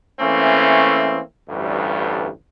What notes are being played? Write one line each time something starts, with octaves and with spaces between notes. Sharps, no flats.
E3 A3 A#3 C4 C#4
A1 D2 G2